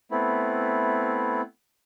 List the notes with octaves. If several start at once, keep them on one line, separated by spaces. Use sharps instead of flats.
A3 B3 C4 E4